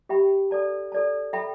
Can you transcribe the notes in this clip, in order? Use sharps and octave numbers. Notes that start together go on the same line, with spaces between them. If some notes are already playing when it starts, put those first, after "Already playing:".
G4 E5 G5 B5
A4 D5 A5
A4 D5 A5
A4 E5 G5 B5